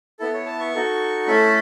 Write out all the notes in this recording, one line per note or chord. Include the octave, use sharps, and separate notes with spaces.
B3 E4 A4
C#5
A5
C#6
D#4 F#4 A4
A3 C#4 E4 A4 B5